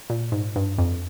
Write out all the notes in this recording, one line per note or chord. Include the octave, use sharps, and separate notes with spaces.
A#2
G#2
G2
F2